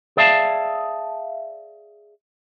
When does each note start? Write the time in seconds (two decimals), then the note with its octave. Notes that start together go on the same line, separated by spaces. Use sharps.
0.17 G#4 D5 E5 F5 A5